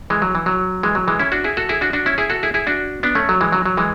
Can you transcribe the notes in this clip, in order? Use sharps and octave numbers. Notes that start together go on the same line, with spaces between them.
E3 G#3
F#3
E3
F#3
E3 G#3
F#3
E3 G#3
C#4 E4
D4 F#4
E4 G#4
F#4 A4
E4 G#4
D4 F#4
D4 F#4
C#4 E4
E4 G#4
F#4 A4
E4 G#4
E4 G#4
D4 F#4
B3 D4
A3 C#4
F#3
E3 G#3
F#3
F#3
E3 G#3